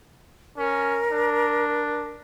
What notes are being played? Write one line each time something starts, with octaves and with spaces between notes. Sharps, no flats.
C#4 A#4
D4